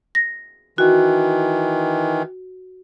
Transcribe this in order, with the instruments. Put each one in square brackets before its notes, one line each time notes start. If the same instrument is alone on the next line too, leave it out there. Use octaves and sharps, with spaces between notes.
[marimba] A#6
[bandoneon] D#3 E3 [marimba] F#4